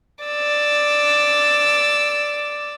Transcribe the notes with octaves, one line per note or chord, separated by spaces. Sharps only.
D5 E6